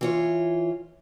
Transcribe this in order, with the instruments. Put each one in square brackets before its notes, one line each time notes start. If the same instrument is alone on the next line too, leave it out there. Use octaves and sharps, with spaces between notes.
[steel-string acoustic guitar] E3 F4 C#5